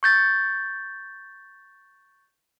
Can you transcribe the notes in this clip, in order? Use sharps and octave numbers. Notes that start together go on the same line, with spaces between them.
C#6 G6 A6